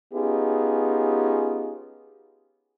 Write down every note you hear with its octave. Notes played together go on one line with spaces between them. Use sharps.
B3 C#4 D#4 F4 G4 G#4